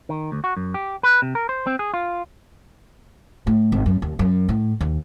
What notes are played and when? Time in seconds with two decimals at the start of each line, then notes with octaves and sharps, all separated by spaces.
0.09 D#3
0.32 D2
0.44 F#4
0.57 F#2
0.74 G4
1.03 B4
1.22 C3
1.35 A#4
1.49 C5
1.67 C4
1.79 G#4
1.94 F4
3.47 A2
3.72 G#1
3.86 F#2
4.02 D#2
4.19 F#2
4.49 A2
4.81 D#2